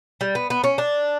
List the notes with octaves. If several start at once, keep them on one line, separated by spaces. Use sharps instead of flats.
G3
B3
B3
C#4
D4